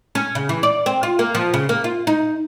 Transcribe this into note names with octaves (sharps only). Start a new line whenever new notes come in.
C#4
C#3
E3
D5
C4
F4
A#3
F3
C#3
A#3
F4
D#4